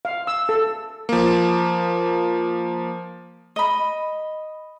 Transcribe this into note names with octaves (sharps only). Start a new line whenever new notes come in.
F5
E6
A4
F3 A#3
D#5 B5